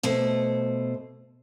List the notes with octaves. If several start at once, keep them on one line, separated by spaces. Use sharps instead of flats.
B2 A3 C5